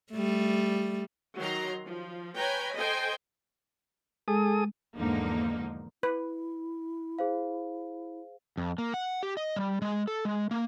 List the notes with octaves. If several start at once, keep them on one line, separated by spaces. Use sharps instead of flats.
G3 A3
D#3 F#3 A#5 C6
F3
B4 C#5 G5 G#5 A#5 B5
A4 C5 D#5 G5 G#5
G#3 G#4 A4 D#6
E2 G#2 D3 F3 A#3 D#4
E4 B4
G#4 C5 F5
F2
A#3
F#5
G4
D#5
G3
G#3
A4
G#3
A#3